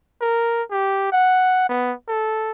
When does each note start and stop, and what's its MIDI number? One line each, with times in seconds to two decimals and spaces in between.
0.21 0.63 70
0.71 1.10 67
1.12 1.68 78
1.69 1.93 59
2.08 2.52 69